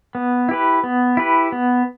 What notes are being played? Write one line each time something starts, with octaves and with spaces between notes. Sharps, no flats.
B3
E4 G4 B4
B3
E4 G4 B4
B3